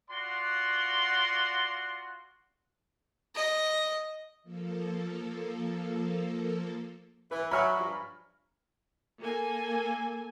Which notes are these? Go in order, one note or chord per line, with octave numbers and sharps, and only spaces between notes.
F4 F#4 D5 F#5 C6
D#5
F3 A#3 A4
E3 B4
F#3 C#5 E5 G#5 A#5 B5 C#6 F6
G2 F3
A#3 A4 G#5